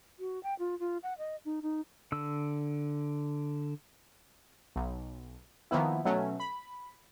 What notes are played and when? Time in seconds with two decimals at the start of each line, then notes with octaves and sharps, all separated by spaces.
0.19 F#4
0.43 G5
0.59 F4
0.79 F4
1.03 F#5
1.18 D#5
1.45 D#4
1.62 D#4
2.12 D3 E6
4.76 B1
5.71 D#3 F3 A#3 B3 E4
6.05 B2 F#3 A3 C#4
6.40 B5